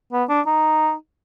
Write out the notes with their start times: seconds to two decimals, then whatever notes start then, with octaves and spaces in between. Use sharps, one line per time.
0.12 B3
0.29 D4
0.46 D#4